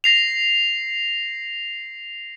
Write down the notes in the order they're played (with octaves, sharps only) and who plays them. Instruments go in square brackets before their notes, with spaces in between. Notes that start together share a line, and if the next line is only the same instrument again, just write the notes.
[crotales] A#6 C7 F7